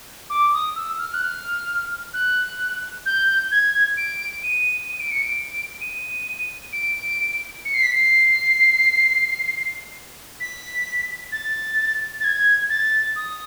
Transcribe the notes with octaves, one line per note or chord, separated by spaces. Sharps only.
D6
D#6
E6
F6
F#6
F6
F#6
G6
G#6
D7
D#7
D#7
D7
C#7
D7
D#7
D7
C#7
C7
B6
C7
B6
A6
A6
G#6
A6
D#6